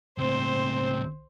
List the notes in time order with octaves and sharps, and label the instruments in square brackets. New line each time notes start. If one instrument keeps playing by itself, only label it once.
[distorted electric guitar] C#2 A2 [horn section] C4 [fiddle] C5